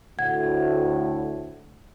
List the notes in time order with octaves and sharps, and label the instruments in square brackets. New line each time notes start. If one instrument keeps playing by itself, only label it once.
[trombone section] D2 A2 [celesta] F#5 G#6